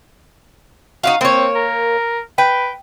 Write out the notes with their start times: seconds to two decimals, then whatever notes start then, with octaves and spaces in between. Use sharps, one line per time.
1.04 D#4 E4 F#4 F5
1.21 A#3 C4 C#5
1.55 A#4
2.38 B4 G5